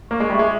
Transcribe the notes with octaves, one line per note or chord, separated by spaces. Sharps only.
A#3 C#6
G#3
G3 E5
G#3